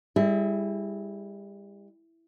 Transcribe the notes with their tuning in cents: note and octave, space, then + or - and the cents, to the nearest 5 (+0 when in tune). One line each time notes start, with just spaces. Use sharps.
G3 +35 E4 +0 G#4 +35